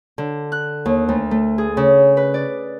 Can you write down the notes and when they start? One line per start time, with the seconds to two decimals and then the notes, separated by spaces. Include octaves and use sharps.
0.18 D3
0.52 F#6
0.85 D#2
1.09 D2
1.31 A3
1.58 G#4
1.77 C#3
2.17 B4
2.34 D5